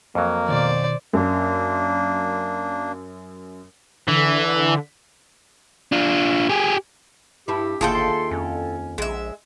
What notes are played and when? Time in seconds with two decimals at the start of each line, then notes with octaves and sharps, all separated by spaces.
0.15 F2 F#3 A#3
0.49 B2 D#3 C5 D5
1.13 F#2 A#3 D4
4.08 D3 E3
5.92 D4 F4
6.49 G4 G#4
7.48 G2 E4 G4
7.81 G1 D#2 E4 F4 G#4 A4 G5
7.94 C6
8.31 F2 C#4
8.98 A#1 G#3 E5